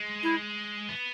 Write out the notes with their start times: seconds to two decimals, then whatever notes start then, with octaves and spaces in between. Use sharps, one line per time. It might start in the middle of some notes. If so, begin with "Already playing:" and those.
Already playing: G#3
0.23 E4
0.89 B3